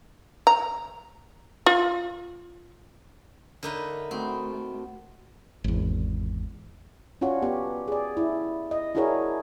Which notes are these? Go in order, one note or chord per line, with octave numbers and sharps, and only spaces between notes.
A#5
F4
D3 D#4 A#4 B4 E5
A3 C4 D#4 F#4 B5
G#1 E2
C#4 D4 F4 F#4 C#5
B3 G4
G#4 D5
E4
D#5
D4 E4 F#4 G#4 A#4 C#5